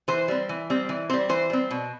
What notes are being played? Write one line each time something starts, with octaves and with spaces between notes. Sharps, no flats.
E3 C5
G3 C4
E3
G3 C4
E3
G3 C4 C5
E3 C5
G3 C4
B2